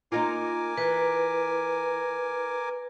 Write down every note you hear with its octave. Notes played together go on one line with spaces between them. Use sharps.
A#3 D#4 F4 A#4 G#5 D6
E3 B4